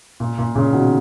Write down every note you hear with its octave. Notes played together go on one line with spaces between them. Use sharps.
A#2
A#2
A#2 C#3
B2 D#3